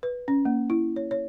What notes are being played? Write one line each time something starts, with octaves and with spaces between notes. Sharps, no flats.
B4
C#4
A#3
E4
C#5
C#5